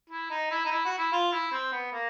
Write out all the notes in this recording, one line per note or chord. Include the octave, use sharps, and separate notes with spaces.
E4
D#4
E4
D#4
E4
F#4
E4
F4
E4
C4
B3
A#3